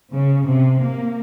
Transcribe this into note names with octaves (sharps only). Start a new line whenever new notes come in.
C#3
C3
A#3